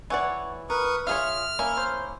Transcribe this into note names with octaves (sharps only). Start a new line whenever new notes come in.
E3 C#5 D5 F#5
A#4 B4 C#6 D#6
F4 G#4 C#5 E5 F6
A#3 C#4 E4
C5